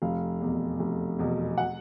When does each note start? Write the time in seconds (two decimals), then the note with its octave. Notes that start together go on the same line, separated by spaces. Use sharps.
0.02 F1 F5
0.41 E2 B2
0.79 F1
1.19 E2 B2
1.58 F#5